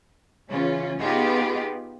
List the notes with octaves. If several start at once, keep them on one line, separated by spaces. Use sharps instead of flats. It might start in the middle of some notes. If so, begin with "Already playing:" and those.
C#3 E3 C#4 F4
B3 D#4 F4 G4 G#4 B4